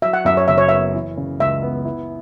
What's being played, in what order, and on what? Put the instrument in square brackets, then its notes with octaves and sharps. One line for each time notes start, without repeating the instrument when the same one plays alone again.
[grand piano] F#3 [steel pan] E5
[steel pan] F#5
[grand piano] F#2 [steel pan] E5
[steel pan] C#5
[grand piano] F#1 [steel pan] E5
[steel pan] C#5
[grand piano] B3 [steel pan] E5
[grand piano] E3
C#3
[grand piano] C#2 [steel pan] E5
[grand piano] B3
E4